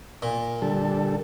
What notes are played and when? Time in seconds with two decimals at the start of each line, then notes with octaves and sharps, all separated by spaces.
0.22 A#2
0.62 D3 G3 A4